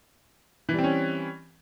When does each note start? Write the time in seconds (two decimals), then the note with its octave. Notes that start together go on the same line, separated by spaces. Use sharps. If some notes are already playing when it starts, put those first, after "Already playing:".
0.69 E3
0.74 G3
0.78 C4
0.83 C#4